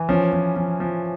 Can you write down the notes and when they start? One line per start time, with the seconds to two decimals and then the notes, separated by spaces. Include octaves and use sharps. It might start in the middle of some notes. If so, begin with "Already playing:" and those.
Already playing: E3
0.09 F3 C#4
0.33 F3
0.56 F3
0.80 F3